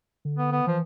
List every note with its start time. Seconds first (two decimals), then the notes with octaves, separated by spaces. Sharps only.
0.25 D3
0.38 B3
0.52 B3
0.67 E3 F3